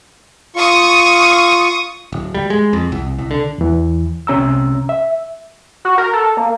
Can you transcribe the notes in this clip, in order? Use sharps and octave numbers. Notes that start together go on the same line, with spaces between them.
F4 C#6 D#6
D1
G3
G#3
F2
C2
C2
D3
E2 E3
C2 C3 C#4 A#5 E6
E5
F#4
A#4
A4
A#3